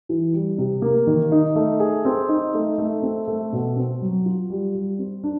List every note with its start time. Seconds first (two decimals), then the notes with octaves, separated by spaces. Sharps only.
0.09 E3
0.33 G3
0.58 C3
0.82 A#3
1.07 D#3
1.32 D#4
1.55 A3
1.80 G#4
2.05 C4
2.29 D#4
2.54 A3
2.78 A3
3.02 C4
3.28 A3
3.52 B2
3.76 C4
4.01 F#3
4.25 F4
4.50 G3
4.75 G3
4.99 C4
5.24 D4